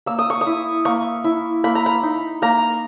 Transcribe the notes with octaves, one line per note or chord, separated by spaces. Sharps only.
A#3 E6
D#6
C#6
D#6
E4
A#3 C#6
E4
A#3 B5
A#5
B5
D#4
A#3 A#5